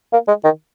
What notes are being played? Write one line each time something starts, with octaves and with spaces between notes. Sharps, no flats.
A#3
G#3
D#3